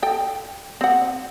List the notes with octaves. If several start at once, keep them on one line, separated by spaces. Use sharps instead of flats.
A4 G5
C4 F#5